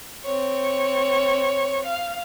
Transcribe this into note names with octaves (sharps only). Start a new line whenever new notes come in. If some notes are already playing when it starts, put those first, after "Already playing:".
C4 C#5
F5